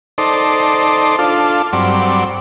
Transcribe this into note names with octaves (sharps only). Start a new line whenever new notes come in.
D#4 A4 C5 D5
D4 F4 A4
G2 F#3 C4 D5